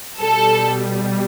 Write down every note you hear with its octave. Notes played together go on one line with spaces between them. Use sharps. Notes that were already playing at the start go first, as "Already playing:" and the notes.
B2 G3 A4